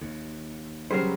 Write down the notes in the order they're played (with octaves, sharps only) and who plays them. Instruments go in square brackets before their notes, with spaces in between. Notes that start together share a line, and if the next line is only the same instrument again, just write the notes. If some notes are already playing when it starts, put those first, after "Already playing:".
[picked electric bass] D#2
[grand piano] C#3 F#3 G3 [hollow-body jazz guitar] A#4 C5